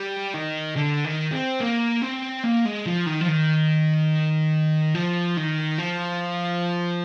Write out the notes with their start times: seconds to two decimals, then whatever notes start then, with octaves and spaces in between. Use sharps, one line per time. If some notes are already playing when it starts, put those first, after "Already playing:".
Already playing: G3
0.34 D#3
0.76 D3
1.05 D#3
1.32 C4
1.60 A#3
2.02 C4
2.44 A#3
2.65 G#3
2.86 F3
3.06 D#3
3.21 F3
3.28 D#3
4.95 F3
5.37 D#3
5.79 F3